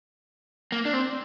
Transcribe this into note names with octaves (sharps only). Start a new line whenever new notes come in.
A#3
D4
C4